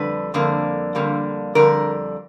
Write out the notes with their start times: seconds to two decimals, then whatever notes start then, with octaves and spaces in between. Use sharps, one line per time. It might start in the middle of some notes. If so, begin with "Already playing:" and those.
Already playing: F2 D3 G3 B4
0.34 F2 D3 G3 A#3
0.95 F2 D3 G3 A#3
1.55 F2 D3 G3 A#4